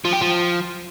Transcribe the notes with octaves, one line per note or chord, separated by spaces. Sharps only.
F3
G4
F3